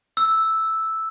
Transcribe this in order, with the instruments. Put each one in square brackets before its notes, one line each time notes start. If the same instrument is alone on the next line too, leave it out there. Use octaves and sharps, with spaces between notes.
[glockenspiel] E6